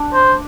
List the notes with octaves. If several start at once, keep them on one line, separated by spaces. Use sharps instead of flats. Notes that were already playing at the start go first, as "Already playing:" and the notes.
Already playing: D4
C5